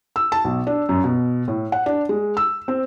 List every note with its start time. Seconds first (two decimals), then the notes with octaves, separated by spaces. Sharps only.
0.16 E6
0.32 A5
0.45 B1
0.67 D4
0.89 F#2
1.04 B2
1.48 A2
1.72 F#5
1.86 D4
2.09 G#3
2.37 E6
2.68 C4